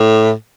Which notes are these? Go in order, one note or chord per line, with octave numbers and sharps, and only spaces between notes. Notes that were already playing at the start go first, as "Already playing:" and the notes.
Already playing: A2